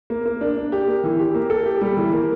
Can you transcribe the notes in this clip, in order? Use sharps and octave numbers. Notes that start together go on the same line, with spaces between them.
A#3
A#3
D4
D4
G4
A#3
E3
G4
A#3
A4
G4
G3
E3
A#3